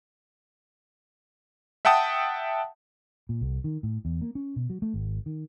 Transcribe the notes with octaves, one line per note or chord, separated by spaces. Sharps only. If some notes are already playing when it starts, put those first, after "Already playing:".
E5 F#5 G5 A5 D#6
A#2
C2
D#3
A2
E2
A#3
C#4
B2
F#3
A3
G#1
D#3